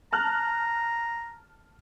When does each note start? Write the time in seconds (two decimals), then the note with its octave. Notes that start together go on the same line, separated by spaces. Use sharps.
0.13 A5 A#5 F6 F#6